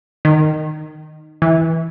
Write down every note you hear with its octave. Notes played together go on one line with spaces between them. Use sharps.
D#3
E3